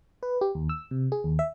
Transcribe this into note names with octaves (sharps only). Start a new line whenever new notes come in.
B4
G4
D#2
E6
C3
G#4
D#2
E5